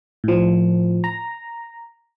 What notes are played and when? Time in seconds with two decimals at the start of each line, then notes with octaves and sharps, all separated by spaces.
0.24 A2 F3
1.04 A#5